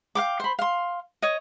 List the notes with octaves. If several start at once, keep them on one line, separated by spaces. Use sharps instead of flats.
F5 G5 D6
C5 B5
F5 C6
C#5 D#5